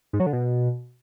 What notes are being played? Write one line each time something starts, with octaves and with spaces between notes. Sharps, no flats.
G#2
F#3
D3
B2